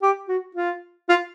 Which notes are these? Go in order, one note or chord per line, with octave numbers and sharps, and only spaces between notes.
G4
F#4
F4
F4